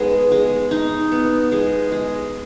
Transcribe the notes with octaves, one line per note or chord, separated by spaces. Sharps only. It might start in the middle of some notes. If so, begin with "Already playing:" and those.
Already playing: G#3 B3 D#4
G#3
D#4
B3
G#3
G#3